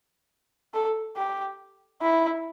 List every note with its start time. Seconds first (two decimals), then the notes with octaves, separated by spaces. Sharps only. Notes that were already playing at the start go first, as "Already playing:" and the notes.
0.74 A4
1.17 G4
2.02 E4